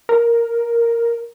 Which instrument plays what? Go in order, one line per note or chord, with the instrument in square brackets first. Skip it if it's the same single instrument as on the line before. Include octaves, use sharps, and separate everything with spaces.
[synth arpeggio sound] A#4